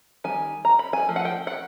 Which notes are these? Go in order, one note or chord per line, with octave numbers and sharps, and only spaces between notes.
D#3 G3 G#5
A#5
B5
G#5
F3 A3
F#5
G5
F#5